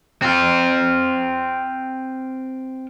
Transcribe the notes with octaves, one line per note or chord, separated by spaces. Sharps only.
C4 F4